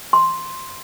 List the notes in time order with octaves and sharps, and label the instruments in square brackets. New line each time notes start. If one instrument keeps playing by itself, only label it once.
[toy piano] C6